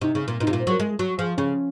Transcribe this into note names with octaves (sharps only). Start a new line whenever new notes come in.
C3 D#4
C#3
A#2
A#2 D#4
C3
F4
A#2
C5
F#3 A#4
G#3
F#3
F3 G#4
C#3 C#4